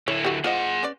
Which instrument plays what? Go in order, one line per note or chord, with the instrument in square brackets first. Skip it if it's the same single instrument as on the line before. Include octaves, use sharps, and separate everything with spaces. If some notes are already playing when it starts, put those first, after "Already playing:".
[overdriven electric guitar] D3 E4 [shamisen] C#5
[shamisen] F#4 G4
[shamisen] F4 C5 D#5 [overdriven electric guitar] G#4 F#5
[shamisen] C#4 B4 D5